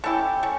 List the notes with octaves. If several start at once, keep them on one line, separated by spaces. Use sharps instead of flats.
A3 C#4 E4 G4
A3 C#4